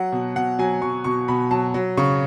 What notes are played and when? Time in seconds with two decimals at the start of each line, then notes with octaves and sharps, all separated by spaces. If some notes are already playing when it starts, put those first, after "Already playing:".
Already playing: F#3 F#5
0.12 B2
0.36 B2 F#5
0.59 F#3 G#5
0.82 F#3 C#6
1.04 B2 C#6
1.28 B2 B5
1.51 F#3 A5
1.74 F#3
1.97 C#3 C#6